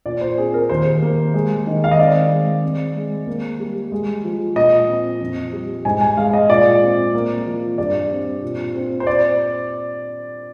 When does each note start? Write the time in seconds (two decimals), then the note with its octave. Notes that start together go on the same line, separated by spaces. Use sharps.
0.06 A#2 D5
0.21 C5
0.37 C4 G#4
0.54 A#4
0.69 D#2 C5
1.02 A#3
1.34 G#3
1.67 D#3
1.84 F5
1.91 D#5
1.98 C4 D5
2.30 G#3
2.63 C4
2.95 G#3
3.27 A#3
3.60 G3
3.92 G#3
4.24 F3
4.56 A#2 D#5
4.88 C4
5.20 F2
5.52 G3
5.85 G#2 G#5
6.01 G#5
6.17 G#3 F5
6.33 D#5
6.49 A#2 D5
6.82 C4
7.14 A#3
7.46 F3
7.78 G2 D5
8.10 C4
8.42 A#2
8.75 C4
9.00 C5
9.07 D5